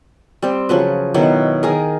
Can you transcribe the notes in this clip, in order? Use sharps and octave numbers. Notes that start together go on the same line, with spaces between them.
G3 C4
C#3 F3 F#3 B4
B2 D#3 F#3 E4
D#3 G#4 A#4